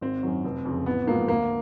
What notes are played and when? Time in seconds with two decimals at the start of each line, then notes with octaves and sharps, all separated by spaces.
0.01 G#1 C4
0.23 F#2 D#3 F#3
0.44 F1
0.65 F2 C#3
0.86 A1 B3
1.07 G#2 F3 A#3
1.28 D2 A#3